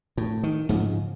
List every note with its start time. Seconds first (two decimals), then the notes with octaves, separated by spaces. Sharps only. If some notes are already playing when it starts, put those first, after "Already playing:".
0.17 A2
0.43 D#3
0.69 G#2 C#3 F3